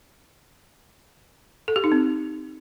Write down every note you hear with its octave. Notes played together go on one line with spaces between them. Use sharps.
A4
G4
D#4
C4